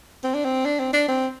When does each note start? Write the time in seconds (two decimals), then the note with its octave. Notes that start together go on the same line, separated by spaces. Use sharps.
0.24 C4
0.34 D4
0.45 C4
0.66 D4
0.79 C4
0.93 D4
1.08 C4